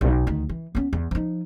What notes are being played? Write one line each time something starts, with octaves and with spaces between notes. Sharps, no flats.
B1
D2 D#3
E3
B3 C#4
E2
F3 D#4